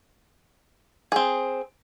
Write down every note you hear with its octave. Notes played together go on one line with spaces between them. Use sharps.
C4 G#4